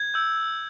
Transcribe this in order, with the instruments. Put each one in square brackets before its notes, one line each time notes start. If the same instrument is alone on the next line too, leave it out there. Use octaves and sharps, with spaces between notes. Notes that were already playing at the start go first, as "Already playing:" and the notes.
Already playing: [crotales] G#6
E6 G6